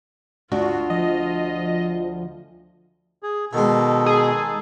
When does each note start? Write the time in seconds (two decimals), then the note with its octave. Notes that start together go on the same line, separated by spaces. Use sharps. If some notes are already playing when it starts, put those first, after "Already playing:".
0.52 D2 D4 F4 F#4
0.90 F3 D#5
3.23 G#4
3.53 B2 D#3 G#3 D#4 A4
4.06 G#4